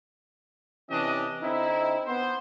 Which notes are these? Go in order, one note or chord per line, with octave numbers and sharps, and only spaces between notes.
C3 E3 C#4 D4 G4 D#5
D3 C4 D#4 E4
B3 C5